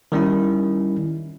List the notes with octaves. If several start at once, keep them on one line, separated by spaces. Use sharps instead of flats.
D#3 G3 C#4 E4